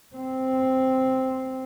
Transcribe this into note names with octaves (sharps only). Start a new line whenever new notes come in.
C4